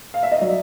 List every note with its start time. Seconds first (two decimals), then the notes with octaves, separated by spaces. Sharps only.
0.14 F5
0.23 E5
0.32 D#5
0.40 F#3 D5